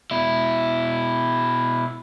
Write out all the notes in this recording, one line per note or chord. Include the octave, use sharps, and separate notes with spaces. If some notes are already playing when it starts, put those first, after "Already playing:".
B2 E4